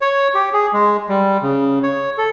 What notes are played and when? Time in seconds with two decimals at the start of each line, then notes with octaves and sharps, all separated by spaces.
0.01 C#5
0.34 G4
0.53 G#4
0.73 G#3
1.08 G3
1.42 C#3
1.83 C#5
2.18 A4